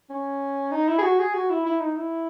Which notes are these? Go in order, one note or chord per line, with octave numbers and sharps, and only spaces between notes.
C#4
D#4
E4
G#4
F#4
G#4
F#4
E4
E4
D#4
E4